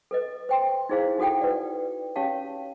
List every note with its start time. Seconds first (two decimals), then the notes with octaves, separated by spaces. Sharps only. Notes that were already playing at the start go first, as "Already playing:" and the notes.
0.11 A4 B4 D#5
0.49 C5 G5 C6
0.89 D#4 E4 G#4 C5 F5
1.18 D#4 F#4 A4 F#5 G5
1.42 B4 D5
2.16 C#4 G4 C#5 F5 A5